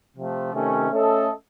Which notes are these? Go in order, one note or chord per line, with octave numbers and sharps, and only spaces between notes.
C3 F3 A3
C3 D#3 A3 C#4
A3 C#4 A4 D#5